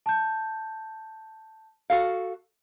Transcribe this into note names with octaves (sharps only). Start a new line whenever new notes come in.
A5 G6
F#4 A4 F5